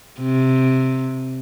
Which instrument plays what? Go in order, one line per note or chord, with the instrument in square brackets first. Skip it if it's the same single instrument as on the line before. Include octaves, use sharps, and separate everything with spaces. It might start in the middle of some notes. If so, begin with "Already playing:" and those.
[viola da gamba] C3